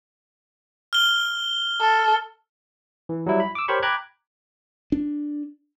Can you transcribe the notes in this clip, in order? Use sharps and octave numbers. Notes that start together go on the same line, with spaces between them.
F6 G7
A4
E3
F#3 G3 E4
B5
D6 E6
G4 A#4 C5 C#5 B5 C#6
G5 A#5 B5 D6 F#6 G#6
D4